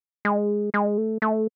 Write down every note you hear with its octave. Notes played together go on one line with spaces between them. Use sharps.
G#3
G#3
A3
A3